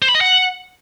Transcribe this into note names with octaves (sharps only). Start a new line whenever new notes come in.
C5
B5
D#5
F#5